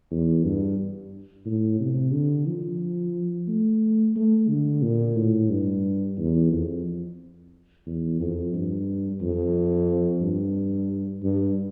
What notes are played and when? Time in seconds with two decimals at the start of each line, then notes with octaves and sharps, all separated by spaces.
0.11 E2
0.45 G2
1.46 A2
1.80 C3
2.13 D3
2.47 F3
3.48 A3
4.16 A3
4.49 D3
4.82 A#2
5.16 A2
5.50 G2
6.18 E2
6.52 F2
7.86 E2
8.20 F2
8.54 G2
9.21 F2
10.22 G2
11.24 G2